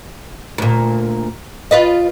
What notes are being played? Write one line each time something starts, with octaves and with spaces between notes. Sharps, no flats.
D2 A#2
F4 B4 D#5